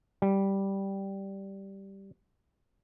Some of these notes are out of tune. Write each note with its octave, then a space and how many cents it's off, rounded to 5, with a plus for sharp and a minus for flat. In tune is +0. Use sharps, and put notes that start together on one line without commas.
G3 -5